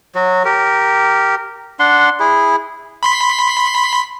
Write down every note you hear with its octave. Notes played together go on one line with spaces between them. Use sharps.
F#3 F#4
G4 A#4
D4 F#5 C6
E4 G#4
B5 C6 B6